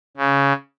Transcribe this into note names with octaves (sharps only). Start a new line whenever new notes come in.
C#3